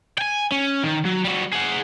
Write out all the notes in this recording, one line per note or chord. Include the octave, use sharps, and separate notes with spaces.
G5 G#5
C#4
D#3
F#3
G3 F#4
G#4 F#5